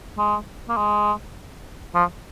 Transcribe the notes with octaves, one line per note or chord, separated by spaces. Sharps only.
G#3
A#3
G#3
F3